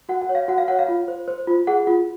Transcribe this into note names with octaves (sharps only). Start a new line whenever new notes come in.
F#4 F#5
F#5
C#5
F5
F#4 F#5
F5
C#5 F#5
F5
F4
C5
C5
F4
G#4 F#5
F4